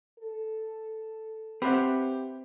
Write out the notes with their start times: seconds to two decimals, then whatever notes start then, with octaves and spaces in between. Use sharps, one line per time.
0.19 A4
1.62 C4 G4 B4 C5 E5 F#5